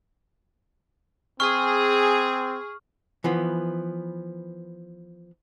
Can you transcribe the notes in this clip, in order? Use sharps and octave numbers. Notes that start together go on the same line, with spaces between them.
C4 G#4 C#6 F6
E3 F3 B3